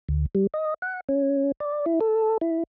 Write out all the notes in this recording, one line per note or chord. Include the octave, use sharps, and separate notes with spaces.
D2
G3
D#5
F#5
C#4
D5
E4
A4
E4